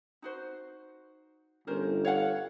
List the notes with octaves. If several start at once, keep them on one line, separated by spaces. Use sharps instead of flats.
D#4 F#4 C5
G1 C#4 A#4 C5
C#5 F5 F#5